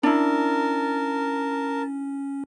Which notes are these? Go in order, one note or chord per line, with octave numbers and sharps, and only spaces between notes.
C#4 D4 E4 A#4 A5